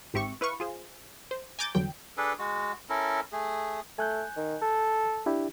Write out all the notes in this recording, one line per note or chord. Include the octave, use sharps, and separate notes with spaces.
G#1 G#2 C4 G4 E5 C#6
E4 B4 F5 C#6
F4 G#4 C5
C5
G#5 A#5 D6 G6 A6
E2 G2 D3 F#3 G5
D4 G#4 A4 B4
G#3 F#4
C#4 E4 A4 A#4
A3 G#4
A3 G#5 F#6 G6
D#3
A4
D4 E4 G4